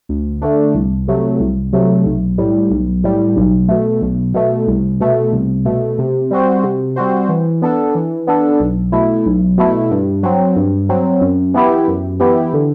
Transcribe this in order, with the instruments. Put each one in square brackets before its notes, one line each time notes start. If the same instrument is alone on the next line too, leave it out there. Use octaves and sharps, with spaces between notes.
[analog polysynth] D2
D3 A3 D4
C2
C3 F#3 A3
C2
C3 F#3 A3
B1
A2 G3
B1
A2 G3
B1
B2 A3
B1
B2 A3
C2
B2 A3
C2
B2 A3
C3
G3 C4 F#4 C5
C3
G3 C4 F#4 C5
E3
B3 D4 A4
E3
B3 D4 A4
B1
B2 A3 E4
B1
B2 A3 E4
G2
F#3 C4
G2
F#3 C4
F#2
E3 B3 E4 G4
F#2
E3 B3 E4 G4
D3